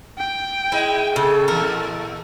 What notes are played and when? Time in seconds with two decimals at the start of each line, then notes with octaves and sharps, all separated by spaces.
0.18 G5
0.72 G#3 E4 D#5
1.16 C#3 A4
1.48 A#2 E3 A#4